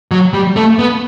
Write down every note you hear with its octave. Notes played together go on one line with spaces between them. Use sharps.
F#3
G3
A3
B3